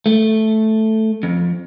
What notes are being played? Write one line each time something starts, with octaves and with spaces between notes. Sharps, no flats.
A3
F2